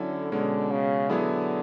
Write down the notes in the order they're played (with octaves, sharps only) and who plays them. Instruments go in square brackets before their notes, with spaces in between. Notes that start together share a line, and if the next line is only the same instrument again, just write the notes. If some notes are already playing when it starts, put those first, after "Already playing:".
Already playing: [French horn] D3 [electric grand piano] F#3 C#4 E4 A4
[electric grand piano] B2 G#3 C#4 [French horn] D3
[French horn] C#3
[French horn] D3 [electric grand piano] F#3 B3 E4 G#4